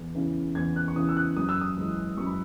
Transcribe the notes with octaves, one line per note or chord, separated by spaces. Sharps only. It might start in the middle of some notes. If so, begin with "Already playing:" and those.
Already playing: E2
C#3 E3
E2 G#6
F#6
C#6
C#3 E3 D#6
E6
F#6
F#2 D#6
E6
D#6
E3 G#3
F#2 C#6
B5